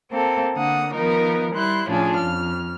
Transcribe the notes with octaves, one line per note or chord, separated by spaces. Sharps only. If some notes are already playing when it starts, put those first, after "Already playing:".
A#3 C4 A4
D3 A#3 F#5 D#6
D#3 F3 B3 D#4 A#4
G3 E4 C6 F#6
A2 F3 C#4 D4 F4 G#4
F2 F6